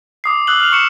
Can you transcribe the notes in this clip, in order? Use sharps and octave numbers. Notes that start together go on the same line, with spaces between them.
D6 D#6 C7
D#6 E6 F#6 F#7
F6 F7
C#6 C#7 E7